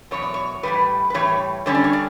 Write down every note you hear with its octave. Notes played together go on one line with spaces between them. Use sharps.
E2 B2 F#3 C#5
D5
C#5
A2 E3 G3 B4
B4
A2 E3 G3 C#5
D3 G3 C#4 C#5
D5
C#5
D5